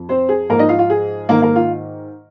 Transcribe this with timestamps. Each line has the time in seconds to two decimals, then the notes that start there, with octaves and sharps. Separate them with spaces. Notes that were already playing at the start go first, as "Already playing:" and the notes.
Already playing: F2 F3
0.09 C4 C5
0.29 G#4
0.49 G#2 F3 A#3 A#4
0.59 D#4 D#5
0.69 F4 F5
0.79 F4
0.90 G#4
1.29 G#2 D#3 A#3 A#4
1.42 A#3 A#4
1.56 F4